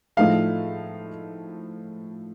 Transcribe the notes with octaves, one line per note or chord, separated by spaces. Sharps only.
A2 F3 A3 D#4 F5